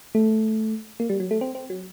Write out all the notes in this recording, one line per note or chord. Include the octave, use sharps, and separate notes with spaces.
A3
A#3
G3
F#3
A3
C4
C4
F#3